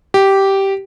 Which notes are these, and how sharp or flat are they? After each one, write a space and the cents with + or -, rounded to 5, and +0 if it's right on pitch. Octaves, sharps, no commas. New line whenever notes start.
G4 -10